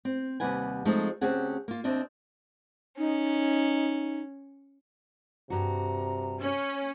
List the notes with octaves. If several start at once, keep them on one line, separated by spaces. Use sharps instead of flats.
C4
D#2 C3 G3 B4 F#5 G#5
F3 G#3 A3 C4 D#4
D2 C4 C#4 G4 G#4 F#5
A#3 F4
D#2 C4 D4 D#5 E5
C#4 D#4
G2 C3 F#4 A#5
C#4